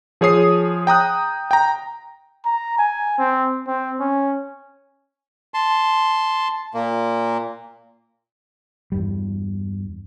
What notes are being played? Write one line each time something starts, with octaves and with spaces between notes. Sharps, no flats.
F3 G#4 C#5 D#6 C7
G5 A#5 D#6 F#6
G5 A#5
A#5
G#5
C4
C4
C#4
A5 C6
A#2 A#3
E2 G2 G3